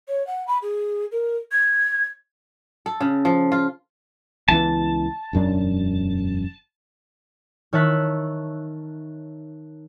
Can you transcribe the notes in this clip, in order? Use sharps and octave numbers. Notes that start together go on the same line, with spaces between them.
C#5
F#5
B5
G#4
A#4
G#6
A4
C#3
F3
F4
C#2 E3 B3 A5
E1 F#2 D4
D#3 C#5 E5 A5 F#6 B6